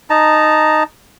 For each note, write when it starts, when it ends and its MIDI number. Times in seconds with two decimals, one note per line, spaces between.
0.10 0.83 63
0.10 0.83 81
0.10 0.83 82